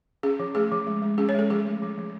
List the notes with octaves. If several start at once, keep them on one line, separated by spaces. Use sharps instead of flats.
C#4 G#4
F3
A3 G#4
F3
G#3
G#3
C#4 G#4
C#5
G#3 A4
F3 G#4
A3
F3
F3